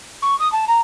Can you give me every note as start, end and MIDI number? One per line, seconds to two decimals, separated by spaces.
0.22 0.38 85
0.40 0.50 87
0.52 0.65 81
0.68 0.81 82